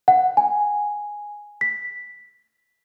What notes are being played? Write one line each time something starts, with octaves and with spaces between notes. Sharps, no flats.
F#5
G#5
B6